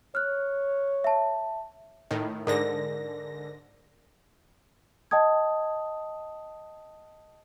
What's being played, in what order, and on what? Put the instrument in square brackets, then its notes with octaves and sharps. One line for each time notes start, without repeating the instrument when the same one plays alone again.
[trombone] C#5 [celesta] F6 F#6
[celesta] E5 A5
[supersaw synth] A2 D#3
[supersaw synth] G#2 D3 A#6 [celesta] A#4 D5
[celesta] D#5 G5 A5 D#6 G#6